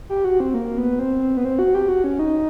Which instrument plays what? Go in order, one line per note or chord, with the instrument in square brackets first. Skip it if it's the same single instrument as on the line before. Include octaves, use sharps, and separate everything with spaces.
[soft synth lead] G4
F#4
C4
A#3
B3
C4
B3
C4
F#4
G4
F#4
C#4
D#4